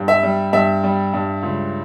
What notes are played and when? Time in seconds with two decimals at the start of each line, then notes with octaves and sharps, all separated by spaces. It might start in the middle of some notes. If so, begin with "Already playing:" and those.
Already playing: G2
0.08 E5
0.23 G3
0.53 G2 E5
0.84 G3
1.14 G2
1.43 C#2